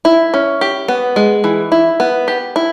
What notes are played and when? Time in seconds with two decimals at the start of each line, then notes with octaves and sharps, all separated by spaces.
0.05 E4
0.34 C#4
0.61 G4
0.88 B3
1.16 G#3
1.44 E3
1.72 E4
2.00 B3
2.28 G4
2.56 E4